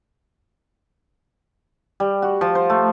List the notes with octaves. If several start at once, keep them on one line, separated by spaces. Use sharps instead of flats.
G3
F#4
F3
C5
A3